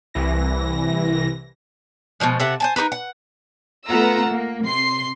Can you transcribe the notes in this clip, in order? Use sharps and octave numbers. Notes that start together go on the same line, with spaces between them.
C2 E3 A#6
B2 E3 F3 G#3
C3 A4 E5 F#5
C5 G#5 A5
D#4 G4 A#4 B4
F#5
A3 B3 F4 F#5 A#5 E6
A#3
C3 C6 C7